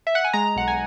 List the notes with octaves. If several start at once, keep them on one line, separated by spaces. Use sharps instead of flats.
E5
F#5
G#5
G#3 A#5
B1 F#5
G#5